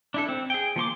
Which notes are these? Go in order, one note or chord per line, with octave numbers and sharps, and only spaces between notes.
D4 E4 A4
C4
G#4 G5
F3 A#3 C6 D6